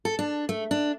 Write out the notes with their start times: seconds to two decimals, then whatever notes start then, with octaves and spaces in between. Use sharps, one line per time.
0.05 A4
0.19 D4
0.49 A3
0.71 D4